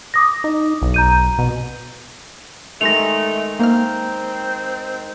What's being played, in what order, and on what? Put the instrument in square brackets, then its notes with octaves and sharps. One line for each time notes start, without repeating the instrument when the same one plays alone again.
[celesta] D6 D#6 A#6
[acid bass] D#4
B1
[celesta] A#5 G6 D#7
[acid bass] B2
[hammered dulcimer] D#3 G#3 G4 [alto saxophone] A3 [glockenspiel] A#6 F7
[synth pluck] A#3 F6 [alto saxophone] C4 [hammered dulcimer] D#4